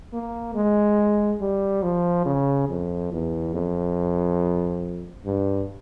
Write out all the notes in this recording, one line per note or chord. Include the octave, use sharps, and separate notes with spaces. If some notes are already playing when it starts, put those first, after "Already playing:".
A#3
G#3
G3
F3
C#3
F2
E2
F2
G2